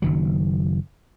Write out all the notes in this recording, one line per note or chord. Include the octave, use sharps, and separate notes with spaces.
F#1 D#3 F#3